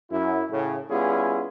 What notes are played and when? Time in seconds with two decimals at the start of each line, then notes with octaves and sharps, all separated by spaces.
0.11 F#2 E4
0.50 A2 C#3
0.90 G3 B3 C#4 E4 F4 G#4